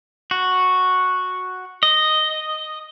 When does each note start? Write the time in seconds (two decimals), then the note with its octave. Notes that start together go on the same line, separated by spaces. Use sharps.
0.31 F#4
1.83 D#5